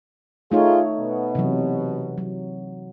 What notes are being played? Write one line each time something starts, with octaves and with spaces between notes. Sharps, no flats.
A3 D#4 F4 G#4 C#5
B2 B3
C3 E3 F#3
F#3